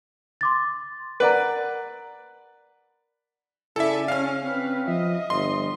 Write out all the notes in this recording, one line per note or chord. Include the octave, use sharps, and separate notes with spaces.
C6 D6 A6
A#4 B4 D5 F#5 A#5
C#3 E4 A4 D5 E5 G#5
C#4 F5 G#5 F6
C4 C#4 B4
F3 D#5 E5
G1 C6